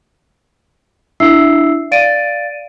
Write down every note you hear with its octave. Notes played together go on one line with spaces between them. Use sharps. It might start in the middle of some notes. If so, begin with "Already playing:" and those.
D4 E4 E5 E6 C7
D5 F5 A6 D7 D#7